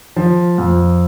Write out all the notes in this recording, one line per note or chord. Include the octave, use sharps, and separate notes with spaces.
F3
F2